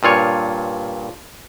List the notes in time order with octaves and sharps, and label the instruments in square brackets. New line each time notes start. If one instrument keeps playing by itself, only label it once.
[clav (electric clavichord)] G2 A#2 F4 C#5